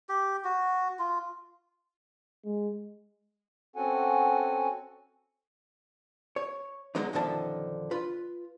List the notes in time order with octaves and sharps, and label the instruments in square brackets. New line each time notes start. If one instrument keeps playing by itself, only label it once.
[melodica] G4
F#4
F4
[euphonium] G#3
[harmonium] C4 C#4 F#4 A4 F#5 G#5
[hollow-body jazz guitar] C#5
C#2 D3 F#3 G#3 B3 D#4
B1 F#2 D3 D#3 F3 A5
F4 B4